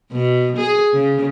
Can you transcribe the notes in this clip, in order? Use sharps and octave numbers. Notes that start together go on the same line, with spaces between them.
B2
G#4
C#3